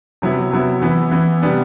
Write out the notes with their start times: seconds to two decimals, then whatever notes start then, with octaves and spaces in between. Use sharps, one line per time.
0.22 C3 F#3 B3 E4
0.52 C3 F#3 B3 E4
0.82 E3 B3 E4
1.11 E3 B3 E4
1.42 C3 G3 B3 D4